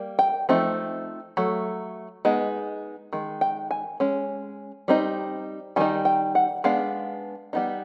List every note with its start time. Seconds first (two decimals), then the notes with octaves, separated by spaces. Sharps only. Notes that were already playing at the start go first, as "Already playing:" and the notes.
Already playing: G3 A#3
0.19 G5
0.49 F3 A3 C4 D#4
1.37 F#3 A3
2.25 G#3 B3 D#4
3.13 D#3 G#3
3.41 G5
3.71 G#5
4.00 G#3 C#4
4.88 G3 C4 D#4
5.76 D#3 G3 D#4 G#5
6.05 G5
6.35 F#5
6.64 G#3 B3 D4 F5
7.53 G3 B3 D#4